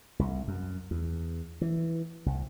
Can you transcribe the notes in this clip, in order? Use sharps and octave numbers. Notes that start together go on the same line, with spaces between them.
C2
F#2
E2
E3
C2